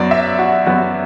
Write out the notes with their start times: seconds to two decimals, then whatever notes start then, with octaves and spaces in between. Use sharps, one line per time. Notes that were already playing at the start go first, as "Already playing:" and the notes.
Already playing: F#2 F#3 B3 D5
0.11 E5
0.39 F#4
0.66 F#2 F#3 B3 F#4